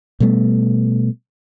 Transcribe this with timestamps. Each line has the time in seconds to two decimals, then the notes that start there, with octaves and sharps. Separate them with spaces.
0.20 B2 G3 A3 B3